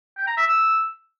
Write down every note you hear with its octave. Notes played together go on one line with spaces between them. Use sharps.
G5
A#5
E5
E6